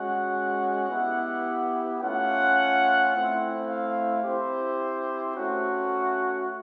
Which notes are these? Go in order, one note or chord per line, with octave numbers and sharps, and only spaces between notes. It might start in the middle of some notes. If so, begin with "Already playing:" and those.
Already playing: G#3 C#4 F#4 F#5
B3 E4 G4
A3 C#4 F4 F#5
A3 C4 E4
F5
C4 E4 G4 C5
A3 C#4 F#4